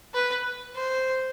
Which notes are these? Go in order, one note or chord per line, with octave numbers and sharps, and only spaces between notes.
B4
C5